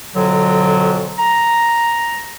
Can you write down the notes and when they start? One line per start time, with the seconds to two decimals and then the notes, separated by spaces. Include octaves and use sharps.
0.16 F2 B2 D3 F#3
1.19 A#5